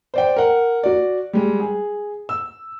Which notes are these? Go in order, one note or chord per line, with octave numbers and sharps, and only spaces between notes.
C5 D5 G5
A#4 F#5
F#4 D5
G3 G#3
G#4
E6